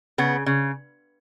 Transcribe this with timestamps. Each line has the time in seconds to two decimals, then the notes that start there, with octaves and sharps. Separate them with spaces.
0.18 C#3 B3
0.46 C#3